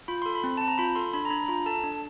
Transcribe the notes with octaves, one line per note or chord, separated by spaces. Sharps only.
F4 B5
A4 C6
B5
C4
C4 A5
A#5
F4 B5
A4 C6
D4 B5
A#5
D4 B5
F4 A#5
A4 A5
D4